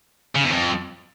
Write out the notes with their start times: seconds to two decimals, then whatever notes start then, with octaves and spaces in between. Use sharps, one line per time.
0.36 C#3
0.44 E2
0.53 F2